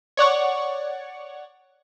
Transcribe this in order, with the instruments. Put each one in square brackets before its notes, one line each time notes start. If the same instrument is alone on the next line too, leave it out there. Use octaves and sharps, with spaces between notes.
[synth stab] C#5 D5 F#5 C#6